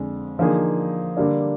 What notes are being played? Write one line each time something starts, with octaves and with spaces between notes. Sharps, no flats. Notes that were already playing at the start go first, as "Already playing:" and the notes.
Already playing: F2 D3 G#3
D3 F3 A#3 D#4 G#4
D3 G3 A#3 D4